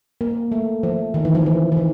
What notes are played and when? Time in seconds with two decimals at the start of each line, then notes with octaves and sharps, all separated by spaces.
0.21 A#3
0.52 A3
0.83 F3
1.14 D#3
1.25 E3
1.35 F3
1.46 E3
1.72 E3
1.77 D#3